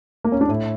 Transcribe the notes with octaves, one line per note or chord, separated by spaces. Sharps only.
A#3
C#4
D4
A2 E4